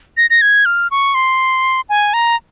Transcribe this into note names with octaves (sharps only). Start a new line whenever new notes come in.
A#6
A#6
G#6
F6
C#6
C6
G#5
A#5